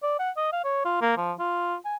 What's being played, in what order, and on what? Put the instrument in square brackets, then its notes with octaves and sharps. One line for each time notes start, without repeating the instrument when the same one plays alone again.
[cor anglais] D5
F#5
D#5
F5
C#5
F4
A#3
F3
F4
G#5